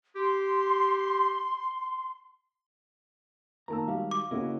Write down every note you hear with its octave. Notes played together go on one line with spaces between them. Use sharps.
G4 C6
D#3 A#3 A#4 A5 A#5 E6
G3 G#3 F#4 F5
D6
C#3 A#3 E4 F#4 C#5 D#5